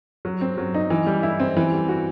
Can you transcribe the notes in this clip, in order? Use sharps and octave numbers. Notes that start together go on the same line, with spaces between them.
F#3
C4
F#3
D#4
E3
G3
E4
C4
E3
G3
F#4